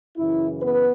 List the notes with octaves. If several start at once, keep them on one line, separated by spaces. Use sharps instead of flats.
F#2 C#3 E3 E4
B3 B4